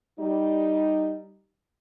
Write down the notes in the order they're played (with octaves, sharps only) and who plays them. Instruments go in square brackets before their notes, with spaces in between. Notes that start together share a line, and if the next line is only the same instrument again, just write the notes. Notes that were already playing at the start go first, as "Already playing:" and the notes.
[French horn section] G3 D#4